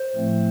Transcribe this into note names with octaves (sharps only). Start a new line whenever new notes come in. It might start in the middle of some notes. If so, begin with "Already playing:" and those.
Already playing: C5
A2 F3 A3 C4